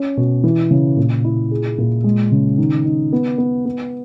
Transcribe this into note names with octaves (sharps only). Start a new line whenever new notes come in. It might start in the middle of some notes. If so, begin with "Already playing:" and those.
Already playing: C#4
B2
E3
C#3
A#2
E4
G#4
A#2
G#3
C#3
D#3
D#4
B3
B3
B3